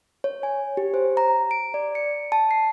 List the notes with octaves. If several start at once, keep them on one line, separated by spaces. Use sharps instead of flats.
C#5
G#5
G4
C5
A#5
D7
D5
C#7
A5
C7